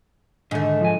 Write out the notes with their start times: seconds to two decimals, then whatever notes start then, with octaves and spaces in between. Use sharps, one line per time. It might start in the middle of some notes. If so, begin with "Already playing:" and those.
0.51 G#2 D3 D#3 A3
0.81 F3 G#5